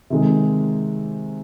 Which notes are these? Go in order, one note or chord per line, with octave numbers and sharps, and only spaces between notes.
C3 D#3 G#3